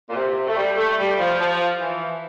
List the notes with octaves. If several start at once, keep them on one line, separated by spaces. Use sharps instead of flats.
A#2
C3
A3
G3
A3
G3
F3
F3
E3